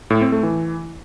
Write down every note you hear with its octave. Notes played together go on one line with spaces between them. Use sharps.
A2
C4
A3
E3